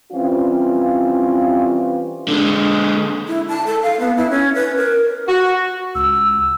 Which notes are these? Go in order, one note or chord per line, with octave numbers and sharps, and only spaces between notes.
E3 G3 C4 C#4 F4
D3 G#3
E4
A5
A4
F5
B3
E4
C#4
B4
A#4
F#4
C#2 E6